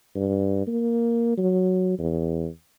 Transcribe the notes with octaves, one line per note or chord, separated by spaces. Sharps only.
G2
A#3
F#3
E2